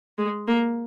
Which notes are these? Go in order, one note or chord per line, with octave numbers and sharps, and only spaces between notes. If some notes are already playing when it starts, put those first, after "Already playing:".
G#3
A#3